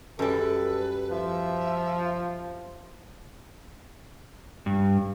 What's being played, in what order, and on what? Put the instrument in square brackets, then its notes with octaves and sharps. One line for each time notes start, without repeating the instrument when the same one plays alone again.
[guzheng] F#2 G3 [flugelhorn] A4 [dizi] B4
[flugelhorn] F3 [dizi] E5
[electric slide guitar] G2